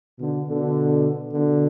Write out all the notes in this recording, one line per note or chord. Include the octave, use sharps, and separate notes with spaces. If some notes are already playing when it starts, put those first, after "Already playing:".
B2 D3
B2 D3
B2 D3